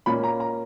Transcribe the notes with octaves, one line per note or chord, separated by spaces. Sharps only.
A#2 A#3 C#4 B5
A#5
A#5